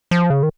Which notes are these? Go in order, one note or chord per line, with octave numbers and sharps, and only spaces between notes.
F3
C#3
D#3